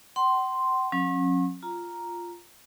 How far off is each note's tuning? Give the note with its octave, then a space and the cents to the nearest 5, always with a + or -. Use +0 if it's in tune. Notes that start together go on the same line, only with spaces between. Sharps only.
F#5 +45 C6 +0
F#3 -40 C#4 -40
F4 +0 A#5 +0